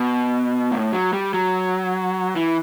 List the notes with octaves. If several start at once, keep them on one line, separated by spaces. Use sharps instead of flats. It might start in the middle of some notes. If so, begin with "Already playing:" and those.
Already playing: B2
A2
F#3
G3
F#3
E3